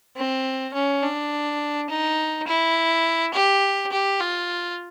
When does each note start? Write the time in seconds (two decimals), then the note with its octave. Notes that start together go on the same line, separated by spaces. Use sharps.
0.16 C4
0.74 C#4
1.02 D4
1.89 D#4
2.47 E4
3.33 G4
3.92 G4
4.20 F4